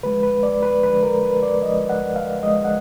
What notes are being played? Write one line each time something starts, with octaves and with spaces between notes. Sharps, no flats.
D3 F3 G#3 B4
B4
D5
B4
D3 F3 G#3 B4
A#4
B4
D5
D3 F3 G#3 D#5
F#5
F5
D3 F3 G#3 D#5
F#5